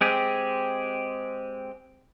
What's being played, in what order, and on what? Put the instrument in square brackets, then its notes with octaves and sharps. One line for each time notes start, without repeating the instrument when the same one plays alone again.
[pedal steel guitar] G#3 C4 G4 G#4